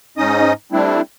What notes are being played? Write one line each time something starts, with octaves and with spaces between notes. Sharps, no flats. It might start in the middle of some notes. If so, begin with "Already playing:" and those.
G#2 C#4 D#4 D#5 D#6
G3 A3 C4 D4 E4